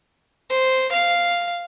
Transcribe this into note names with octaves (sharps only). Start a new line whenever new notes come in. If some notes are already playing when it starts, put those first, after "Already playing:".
C5
F5